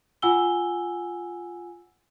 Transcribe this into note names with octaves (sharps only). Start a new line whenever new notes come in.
F4 F#5 G#5 E6 G7